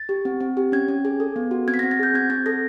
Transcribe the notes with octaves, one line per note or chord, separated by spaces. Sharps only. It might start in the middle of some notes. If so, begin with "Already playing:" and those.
Already playing: A6
G4
C4
C4
G4
C#4 G#6
C#4
G#4
A4
B3
F#4
C4 G#6
B6
A#6
C4
A6
G#4 G6
C4 G#6
C4 A6
A4 A#6